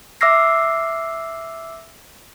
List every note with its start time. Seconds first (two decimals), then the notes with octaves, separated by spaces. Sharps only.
0.21 E5 D6 E6 F6 A#6 C7